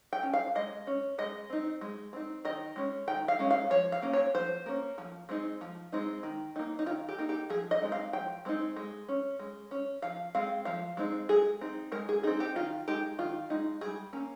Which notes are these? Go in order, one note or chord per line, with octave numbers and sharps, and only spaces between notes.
G5
C#4
F5
G#3 D#5
C#4
G#3 D#5
C4 D#4
G#3
C4 D#4
D#3 D#5
G#3 C#4
D#3 G5
F5
G#3 C#4
F5
F3 C#5
F5
A#3 C#4
C#5
F3 C5
A#3 C#4
F3
G#3 C4 D#4
F3
G#3 C4 D#4
D#3
A#3 D#4
D#4
D#3 F4
G4
A#3 D#4
G4
F3 G#4
D#5
G#3 C4 D#4
F5
F3 G5
G#3 C4 D#4
G#3
C#4
G#3
C#4
F3 F5
G#3 C4 F5
F3 F5
G#3 C4 D#4
G#3 G#4
C4 D#4
G#3 A#4
G#4
C4 D#4 G#4
G4
D#3 F4
G#3 D#4 G4
D#3 F4
G#3 D#4
G3 G#4
A#3 C#4